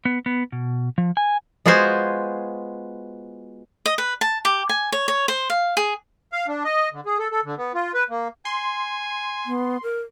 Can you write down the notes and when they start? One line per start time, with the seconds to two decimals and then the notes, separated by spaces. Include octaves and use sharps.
0.05 B3
0.26 B3
0.52 B2
0.98 F3
1.17 G#5
1.66 G#3 B3 F4 F#4 C5 G#5
3.86 D#5
3.98 B4
4.21 A5
4.45 G4
4.69 G#5
4.92 C#5
5.08 C#5
5.28 C5
5.50 F5
5.77 G#4
6.33 F5
6.48 D4
6.64 D#5
6.93 D3
7.06 G#4
7.19 A4
7.31 A4
7.44 D3
7.57 B3
7.74 F4
7.94 B4
8.09 A#3
8.45 G#5 C6
9.46 B3
9.83 A#4